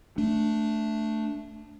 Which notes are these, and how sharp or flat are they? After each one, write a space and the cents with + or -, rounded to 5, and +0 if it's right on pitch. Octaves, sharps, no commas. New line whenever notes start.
A3 +0 D4 +0